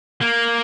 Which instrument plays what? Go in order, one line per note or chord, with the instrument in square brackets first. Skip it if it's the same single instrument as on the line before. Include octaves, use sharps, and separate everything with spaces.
[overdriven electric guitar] A#3